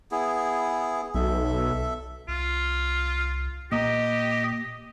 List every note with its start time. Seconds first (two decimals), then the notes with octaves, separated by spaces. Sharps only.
0.11 B3 E4 G#4
1.14 B1 A4 E5
2.28 C2 F4
3.72 A#2 A#3 G4 D#5 A#5